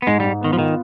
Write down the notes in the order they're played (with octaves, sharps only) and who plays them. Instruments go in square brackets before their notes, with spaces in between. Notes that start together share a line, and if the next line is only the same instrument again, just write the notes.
[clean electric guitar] B3
[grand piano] G#2 [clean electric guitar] G#3
[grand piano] G#2 [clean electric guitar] G3
[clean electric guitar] D#3 [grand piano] B3
[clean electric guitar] F3
[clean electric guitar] D#3 [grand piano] F4